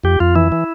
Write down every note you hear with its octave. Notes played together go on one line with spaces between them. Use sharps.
F2 G4
F2 F4
E3 E4
E3